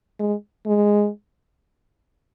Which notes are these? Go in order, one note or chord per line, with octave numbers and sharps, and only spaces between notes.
G#3
G#3